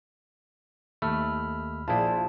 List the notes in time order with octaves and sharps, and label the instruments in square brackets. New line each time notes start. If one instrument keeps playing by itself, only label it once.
[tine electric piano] D#2 [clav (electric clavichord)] A3 [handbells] B5 E6 F6
[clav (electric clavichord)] A#1 E4 [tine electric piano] F4 G#4 D5 [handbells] A5